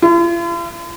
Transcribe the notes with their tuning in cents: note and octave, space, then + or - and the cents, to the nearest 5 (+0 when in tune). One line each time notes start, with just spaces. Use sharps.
F4 -45